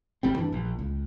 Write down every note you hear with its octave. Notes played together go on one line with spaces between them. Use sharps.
G1 G3 C4
G2 E3 D4
A#1
C#2